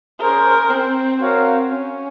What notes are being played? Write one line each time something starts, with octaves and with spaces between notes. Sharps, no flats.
C#4 G#4 A#4 C5
C4
C4 F#4 A#4 C#5 F5
C#4